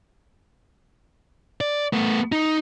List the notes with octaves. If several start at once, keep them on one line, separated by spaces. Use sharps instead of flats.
D5
A3 B3
D#4